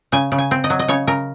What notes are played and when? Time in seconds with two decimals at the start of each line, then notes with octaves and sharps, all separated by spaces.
0.12 C#3 G#5
0.32 C#3
0.38 G#5
0.51 C4
0.64 D#5
0.70 F#3
0.79 D#5
0.88 C#3 C#5
1.07 C#3 A#4